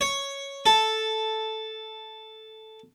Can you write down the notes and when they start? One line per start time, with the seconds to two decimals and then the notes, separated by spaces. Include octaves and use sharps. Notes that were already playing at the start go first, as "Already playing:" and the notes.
0.01 C#5
0.66 A4